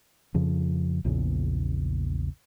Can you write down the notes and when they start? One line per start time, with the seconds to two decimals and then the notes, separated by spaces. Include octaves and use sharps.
0.34 F2 C#3 F3
1.04 A#1 E2 A#2 C#3